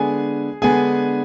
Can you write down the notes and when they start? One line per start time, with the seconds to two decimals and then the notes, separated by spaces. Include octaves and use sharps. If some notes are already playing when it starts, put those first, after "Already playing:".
Already playing: D3 G#3 B3 D4 G#4 G#5
0.62 D3 G#3 B3 D4 G#4 G#5